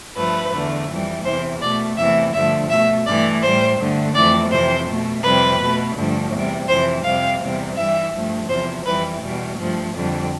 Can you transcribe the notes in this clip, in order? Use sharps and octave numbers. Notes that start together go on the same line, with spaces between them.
G2 F3 A3 B4
E2 D3 A3
F2 E3 G3
E2 C3 E3 C5
B2 A3 D5
E2 C3 E3 A3 E5
G2 D3 F3 A3 E5
B2 A3 E5
G2 E3 A3 D5
A2 G3 C5
G2 D3 A3
F2 E3 A3 D5
F2 C3 E3 C5
B2 A3
F2 C3 G3 B4
B2 A3
G2 D3 F3 A3
E2 C3 G3
F2 C3 E3 C5
F2 C3 G3 F5
E2 C3 G3
G2 E3 G3 E5
G2 F3 A3
E2 C3 F3 C5
F2 E3 G3 B4
E2 B2 G3
G2 F3 A3
F2 D3 G3